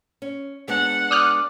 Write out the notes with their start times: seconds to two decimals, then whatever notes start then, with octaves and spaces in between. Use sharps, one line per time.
0.22 C#4
0.68 G#3 B3 D4 F#5
1.11 D5 D#6 F6 F#6